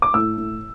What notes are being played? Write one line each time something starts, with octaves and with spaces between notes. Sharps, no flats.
D6
A2 E6
A2